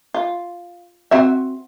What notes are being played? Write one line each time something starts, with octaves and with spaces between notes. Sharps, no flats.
F4
C4 F#4 E5